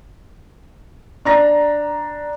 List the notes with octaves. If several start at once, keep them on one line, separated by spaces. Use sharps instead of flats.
D4 A#5 A#6